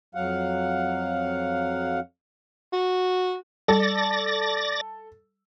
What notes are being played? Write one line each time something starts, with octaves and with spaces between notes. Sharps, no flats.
F2 F#3 F5 F#5
F#4
G3 A4 D5 A6 A#6